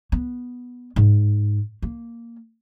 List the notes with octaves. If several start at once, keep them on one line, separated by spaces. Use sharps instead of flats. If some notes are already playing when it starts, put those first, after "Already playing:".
B3
G#2
A#3